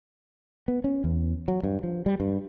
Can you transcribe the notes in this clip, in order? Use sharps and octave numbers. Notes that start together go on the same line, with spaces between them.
B3
C#4
E2
F#3
G2
F3
G3
G2